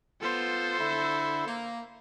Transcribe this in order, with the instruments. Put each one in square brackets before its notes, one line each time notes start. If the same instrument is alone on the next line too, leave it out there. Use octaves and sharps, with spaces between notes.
[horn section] B3 F4 [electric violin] A4 C5
[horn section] D3 E4
A#3